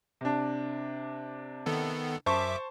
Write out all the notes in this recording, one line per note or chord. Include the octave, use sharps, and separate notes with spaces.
C3 D4
D#3 B3 A4
F#2 C5 E5 A5 C#6 D6